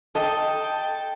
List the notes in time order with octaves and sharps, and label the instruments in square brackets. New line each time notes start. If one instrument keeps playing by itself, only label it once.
[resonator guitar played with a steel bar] A4 D#5 [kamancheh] G5 A5